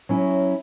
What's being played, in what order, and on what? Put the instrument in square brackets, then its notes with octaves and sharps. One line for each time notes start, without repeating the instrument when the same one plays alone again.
[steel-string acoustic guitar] F#3 C#4 E4